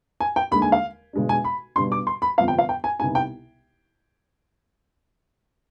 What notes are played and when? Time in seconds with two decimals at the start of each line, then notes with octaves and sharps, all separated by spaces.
0.20 G#5
0.36 G5
0.51 D#2 D3 G#3 B5
0.62 G#5
0.72 F5
1.13 B1 B2 G#3 D4
1.29 G#5
1.44 B5
1.76 B1 B2 G3 D4 C6
1.92 D6
2.07 C6
2.22 B5
2.38 G1 F2 C3 F3 B3 F5
2.48 G5
2.58 F5
2.69 G5
2.84 G#5
2.99 C2 B2 B3 D#4 G#5
3.15 G5